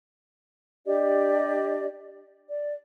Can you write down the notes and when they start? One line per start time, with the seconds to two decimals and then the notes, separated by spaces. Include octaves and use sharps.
0.86 D4 G4 D5 D#5
2.48 D5